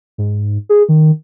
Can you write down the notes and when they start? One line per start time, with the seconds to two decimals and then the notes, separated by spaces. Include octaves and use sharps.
0.18 G#2
0.69 G#4
0.89 D#3